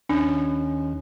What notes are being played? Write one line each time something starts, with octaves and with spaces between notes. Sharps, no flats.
D#2 C#4 D4